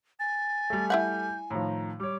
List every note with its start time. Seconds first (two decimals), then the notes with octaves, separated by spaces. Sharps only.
0.20 G#5 A6
0.70 G3 A3
0.90 E4 E5 F#5 G6
1.50 A2 D#3 F3 A#5
2.00 G3 C#5 D6